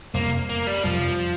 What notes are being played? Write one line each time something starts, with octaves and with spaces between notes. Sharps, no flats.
F2 C3 G3 A#3
A#3
G3
F2 C3 F3 G3